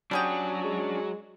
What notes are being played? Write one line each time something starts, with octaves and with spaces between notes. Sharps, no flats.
F#3 G3 C#4 D4 F#4 G#4 G5
G#3